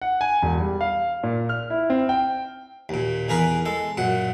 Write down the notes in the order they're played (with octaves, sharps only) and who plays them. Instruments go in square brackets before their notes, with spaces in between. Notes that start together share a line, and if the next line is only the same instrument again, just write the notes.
[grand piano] F#5
G#5
E1
G3
F5
A#2
F6
E4
C4
G5
[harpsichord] D#2 A#2
E2 G#4 A#4 B4
G#3 A4
F#2 A#2 F#5